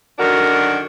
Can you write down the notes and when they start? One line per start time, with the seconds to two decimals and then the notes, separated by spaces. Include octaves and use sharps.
0.18 F#2 D3 D#3 D4 F#4 A#4